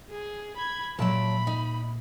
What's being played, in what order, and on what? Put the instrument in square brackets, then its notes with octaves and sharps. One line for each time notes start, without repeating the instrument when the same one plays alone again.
[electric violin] G#4
B5 G#6
[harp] A#2 E5 D7 [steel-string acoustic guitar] F#3 A5 [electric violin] B5
[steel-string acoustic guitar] D#4